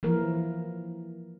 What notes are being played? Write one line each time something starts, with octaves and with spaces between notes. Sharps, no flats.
E3 F3 A#3 A#4